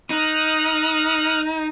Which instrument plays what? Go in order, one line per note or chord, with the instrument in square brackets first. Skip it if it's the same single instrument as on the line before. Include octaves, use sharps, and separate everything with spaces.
[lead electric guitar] D#4 [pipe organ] D#6 F6 F#6